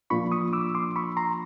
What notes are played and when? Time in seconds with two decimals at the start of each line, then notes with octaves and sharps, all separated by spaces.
0.10 A#2 F3 A#3 D4 F4 B5 C#6
0.32 C#6 D#6
0.53 D6 E6
0.75 C6 D6
0.96 B5 C#6
1.17 A#5 C6